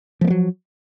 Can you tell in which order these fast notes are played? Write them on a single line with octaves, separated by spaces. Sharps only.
F3 A3 A#3 F#3